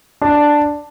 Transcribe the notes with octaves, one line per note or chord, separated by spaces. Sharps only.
D4